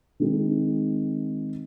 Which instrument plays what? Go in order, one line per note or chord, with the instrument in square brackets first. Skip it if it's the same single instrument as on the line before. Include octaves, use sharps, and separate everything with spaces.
[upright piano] D#3 G#3 C4